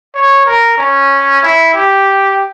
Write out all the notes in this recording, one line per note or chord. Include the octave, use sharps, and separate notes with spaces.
C#5
A#4
C#4
E4
G4